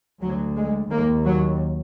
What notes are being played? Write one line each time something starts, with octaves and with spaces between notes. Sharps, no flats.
D2 F#3
G#3
D#2 A#3
F#3